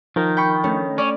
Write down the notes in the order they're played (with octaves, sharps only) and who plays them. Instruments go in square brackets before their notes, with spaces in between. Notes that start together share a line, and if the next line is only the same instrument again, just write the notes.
[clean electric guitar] D#3 [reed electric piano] F3 D#4 A#4
[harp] G5 B5 C#6
A3 C#4
[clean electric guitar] C#4 [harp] D5